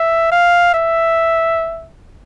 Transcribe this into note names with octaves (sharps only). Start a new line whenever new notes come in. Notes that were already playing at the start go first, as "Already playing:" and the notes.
Already playing: E5
F5
E5